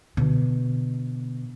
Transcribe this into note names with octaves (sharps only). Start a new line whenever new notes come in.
B2 D3